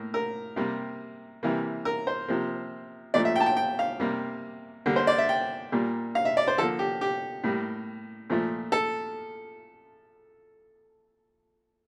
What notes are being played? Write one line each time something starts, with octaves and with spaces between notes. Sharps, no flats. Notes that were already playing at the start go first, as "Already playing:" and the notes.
Already playing: A2 A#3
A#4
C3 G3 A#3
C3 E3 G3 A#3
A#4
C5
C3 F3 A#3
A#2 F3 A3 D5
E5
G5
A5
G5
G5
F5
C3 G3 A#3
D3 G3 A#3
C5
D5
E5
G5
A#2 G3 A#3
F5
E5
D5
C5
D3 F3 A#3 A4
G4
G4
A2 G3 A#3
A#2 F3 A3
A4